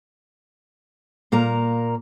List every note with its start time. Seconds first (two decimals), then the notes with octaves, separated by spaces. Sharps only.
1.32 A#2 A#3 A#4 A#5